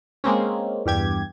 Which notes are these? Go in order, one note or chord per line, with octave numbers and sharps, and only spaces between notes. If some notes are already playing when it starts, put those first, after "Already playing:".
G#3 A#3 C4 C#4
E2 G2 G4 G#6